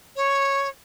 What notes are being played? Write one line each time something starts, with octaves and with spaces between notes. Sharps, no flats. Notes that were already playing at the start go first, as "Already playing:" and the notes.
C#5